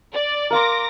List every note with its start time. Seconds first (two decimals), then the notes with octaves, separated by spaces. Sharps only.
0.12 D5
0.51 A#4 F5 C6 D6 A#6